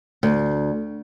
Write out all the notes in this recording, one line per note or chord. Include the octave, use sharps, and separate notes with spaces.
D2